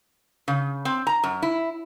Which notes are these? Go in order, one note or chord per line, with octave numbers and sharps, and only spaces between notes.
C#3
C4
A#5
F#2
E4